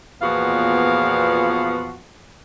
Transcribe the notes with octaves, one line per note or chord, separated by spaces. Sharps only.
E2 A#2 F3 B3 F#4 F5